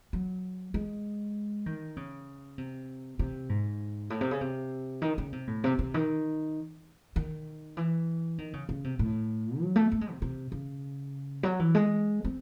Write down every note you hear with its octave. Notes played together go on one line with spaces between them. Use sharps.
F#3
G#3
D#3
C#3
C3
C3
G#2
A2
C3
C#3
C3
D#3
C#3
C3
A2
C3
C3
D#3
D#3
E3
D#3
C#3
C#3
C3
A2
F#3
A3
A3
G#3
C3
C3
C#3
F#3
E3
G#3
C4